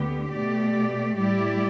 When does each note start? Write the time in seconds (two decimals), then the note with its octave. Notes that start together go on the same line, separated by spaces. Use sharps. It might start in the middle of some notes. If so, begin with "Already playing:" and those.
Already playing: D2 D3 B3 G4
0.32 B2 A3 G4 D5
1.17 A2 G3 E4 G4 D5